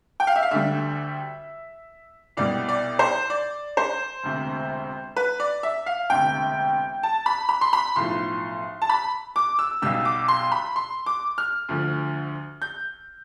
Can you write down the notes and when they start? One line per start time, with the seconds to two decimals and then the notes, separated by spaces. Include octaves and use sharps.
0.20 G5
0.27 F5
0.36 E5
0.43 F5
0.51 D2 D3 G3 E5
2.37 C2 B2 G3 D5
2.68 D5
2.99 C5
3.30 D5
3.77 C5
4.23 E1 D2 C3
5.16 B4
5.40 D5
5.63 E5
5.86 F5
6.10 E1 D2 C3 G5
7.03 A5
7.26 B5
7.49 B5
7.61 C6
7.73 B5
7.96 B1 A2 F3 C6
8.82 A5
8.89 B5
9.36 D6
9.59 E6
9.82 B1 B2 G3 E6
10.05 D6
10.28 C6
10.52 B5
10.76 C6
11.06 D6
11.38 F6
11.69 D2 D3 F3
12.62 G6